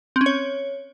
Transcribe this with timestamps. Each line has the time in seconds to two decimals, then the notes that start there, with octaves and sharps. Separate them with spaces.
0.16 C4
0.21 C#4
0.26 C#5